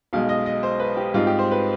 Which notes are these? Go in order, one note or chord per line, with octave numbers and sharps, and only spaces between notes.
B1 B2 G#3 F5
D#5
D#5
C5
B4
G4
G#2 G3 C4 D#4 F4
G4
C5
B4